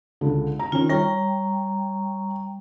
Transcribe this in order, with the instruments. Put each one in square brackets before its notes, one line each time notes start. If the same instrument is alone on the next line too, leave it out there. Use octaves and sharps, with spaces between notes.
[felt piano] C#2 D3
A#5
[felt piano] D#3 C#4 [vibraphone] F4
[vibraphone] G3 G5 A#5 [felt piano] C#5